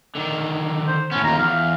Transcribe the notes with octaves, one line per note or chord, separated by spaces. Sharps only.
D3 D#3
C5
A2 B3 C#4
D#2 F4 A#5
E2 F5